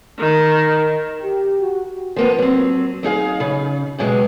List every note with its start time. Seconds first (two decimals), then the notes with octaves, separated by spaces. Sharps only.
0.19 D#3
1.20 G4
1.60 F#4
2.16 F3 A#3 B3
2.39 F#3 C4
3.03 F#3 D#4 G#4 F5
3.40 C#3
3.98 G2 B2 F#3 G#3